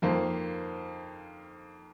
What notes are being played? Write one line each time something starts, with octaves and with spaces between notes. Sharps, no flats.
F2 D#3 A#3 C5